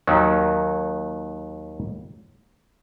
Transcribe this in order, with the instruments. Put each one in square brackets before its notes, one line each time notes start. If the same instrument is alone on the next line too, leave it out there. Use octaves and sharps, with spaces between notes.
[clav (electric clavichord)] D#2 D#3 F#3